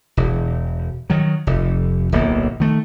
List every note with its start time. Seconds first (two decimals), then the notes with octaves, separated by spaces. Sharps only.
0.17 E1
1.10 D#3 F#3
1.47 F1
2.12 D1 B1 A#3
2.60 D#3 A3